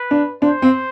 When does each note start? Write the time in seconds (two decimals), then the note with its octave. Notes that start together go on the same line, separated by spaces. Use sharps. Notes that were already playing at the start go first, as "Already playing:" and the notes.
Already playing: B4
0.11 D4
0.42 D4 C5
0.62 C4